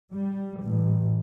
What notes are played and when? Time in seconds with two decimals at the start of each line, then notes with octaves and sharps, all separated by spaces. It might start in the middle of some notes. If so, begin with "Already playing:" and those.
0.13 G3
0.63 A1